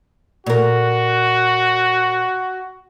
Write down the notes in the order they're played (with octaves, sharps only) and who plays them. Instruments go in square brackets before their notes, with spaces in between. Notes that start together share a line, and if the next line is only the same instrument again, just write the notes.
[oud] A#2 A#4 [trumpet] F#4